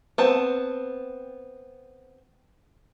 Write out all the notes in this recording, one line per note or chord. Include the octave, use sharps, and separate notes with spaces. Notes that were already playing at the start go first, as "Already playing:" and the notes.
B3 C4 A5